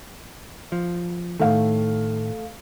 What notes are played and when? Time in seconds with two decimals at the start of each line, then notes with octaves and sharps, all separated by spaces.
0.72 F3
1.40 A2 D#3 A3 F5